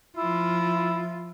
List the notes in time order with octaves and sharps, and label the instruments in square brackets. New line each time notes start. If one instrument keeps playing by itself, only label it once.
[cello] F3 F4 [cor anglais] E4